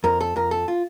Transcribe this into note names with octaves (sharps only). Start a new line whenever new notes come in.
F2 A#4
A4
F2 A#4
A4
F4